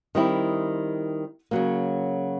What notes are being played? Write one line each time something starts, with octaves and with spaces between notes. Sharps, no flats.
D#3 G3 C4 E4
C#3 F#3 A#3